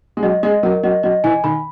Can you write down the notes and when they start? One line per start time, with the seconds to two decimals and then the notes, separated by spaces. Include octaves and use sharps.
0.17 G#3
0.23 F#3 D#5
0.43 G#3 D#5
0.63 F#3 A#4
0.83 F#3 D#5
1.03 F#3 D#5
1.24 E3 G#5
1.44 D#3 B5